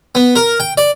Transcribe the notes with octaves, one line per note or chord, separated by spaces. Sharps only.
B3
A#4
G5
D5